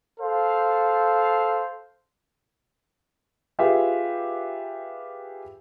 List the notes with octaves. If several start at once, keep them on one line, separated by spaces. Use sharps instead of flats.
A4 C5 F5
F4 G4 G#4 B4 E5 F5